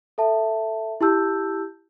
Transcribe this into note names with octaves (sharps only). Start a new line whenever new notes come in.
A4 E5 A5
E4 G4 A5 E6 G6